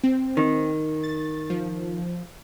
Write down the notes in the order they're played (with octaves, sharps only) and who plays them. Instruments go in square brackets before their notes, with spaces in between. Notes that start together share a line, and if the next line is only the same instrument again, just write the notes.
[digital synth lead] C4
[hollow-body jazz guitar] D#3
[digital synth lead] A6
F3